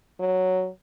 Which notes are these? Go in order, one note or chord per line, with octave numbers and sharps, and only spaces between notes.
F#3